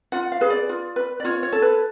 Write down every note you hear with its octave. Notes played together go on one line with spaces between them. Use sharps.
F4 F#5
F5
G#4 B4
D5
F4
B4
D5
F4 C#5
C#5
A4
B4